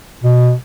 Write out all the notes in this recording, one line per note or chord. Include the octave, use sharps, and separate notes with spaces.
B2